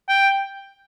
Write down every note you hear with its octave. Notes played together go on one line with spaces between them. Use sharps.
G5